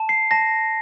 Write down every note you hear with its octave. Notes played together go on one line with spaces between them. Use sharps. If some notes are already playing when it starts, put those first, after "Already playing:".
Already playing: A5
C7
A5 A#6